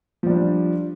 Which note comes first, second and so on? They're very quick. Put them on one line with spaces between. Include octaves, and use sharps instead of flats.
F3 G3 D4